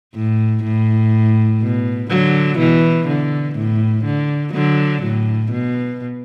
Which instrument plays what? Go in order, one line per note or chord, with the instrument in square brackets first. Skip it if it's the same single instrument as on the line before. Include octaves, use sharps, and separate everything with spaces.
[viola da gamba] A2
A2
B2
D3 F#3
B2 E3
D3
A2
D3
D3 F#3
A2
B2